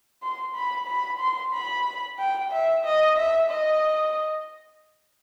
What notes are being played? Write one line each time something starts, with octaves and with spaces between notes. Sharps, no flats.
C6
B5
B5
C6
B5
G5
E5
D#5
E5
D#5